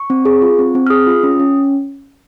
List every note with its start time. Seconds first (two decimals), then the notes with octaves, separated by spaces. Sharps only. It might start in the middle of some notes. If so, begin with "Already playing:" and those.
Already playing: C#6
0.10 C4
0.25 G#4
0.42 F4
0.59 C4
0.75 C4
0.87 F6
0.90 G#4 D#6
1.07 F4
1.23 C#4
1.40 C#4